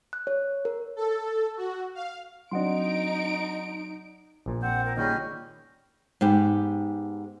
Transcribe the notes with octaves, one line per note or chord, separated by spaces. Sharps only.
F#6
C#5
A#4
A4
F#4
F5
F#3 C4 D4 D#4 D#5 F#5 C6 D7
A#1 A#2
C4 C5 F#5
A#4
A#2 D#3 G3 C#4 G#4 D#5 G6
G#2 B3 G4